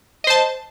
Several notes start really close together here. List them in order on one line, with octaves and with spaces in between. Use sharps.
D#5 C5 A5